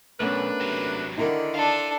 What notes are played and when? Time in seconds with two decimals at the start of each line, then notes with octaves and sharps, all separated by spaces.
0.20 B1 A3 B3 C#4 D4 A#4 B4
0.60 C3 F#3
1.18 D3 D#3 E4 A#4
1.55 D4 A4 F5 A5